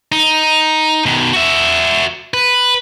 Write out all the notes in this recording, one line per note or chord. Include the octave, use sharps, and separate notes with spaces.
D#4
B2 D#3
F#4 E5
B4